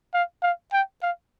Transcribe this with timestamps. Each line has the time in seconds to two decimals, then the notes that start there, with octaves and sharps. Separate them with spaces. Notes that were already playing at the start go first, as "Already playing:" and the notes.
0.14 F5
0.43 F5
0.73 G5
1.02 F5